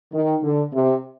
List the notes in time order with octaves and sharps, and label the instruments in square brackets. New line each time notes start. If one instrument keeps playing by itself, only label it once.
[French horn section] D#3
D3
C3